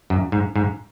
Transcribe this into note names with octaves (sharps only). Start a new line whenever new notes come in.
F#2
G#2
G#2